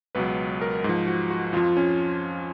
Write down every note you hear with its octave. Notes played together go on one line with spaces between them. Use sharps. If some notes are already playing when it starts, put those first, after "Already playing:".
C#2 B2 F#3 B4
A#4
G#2 F3
F#4
F#4
F2 F3 F4
C#4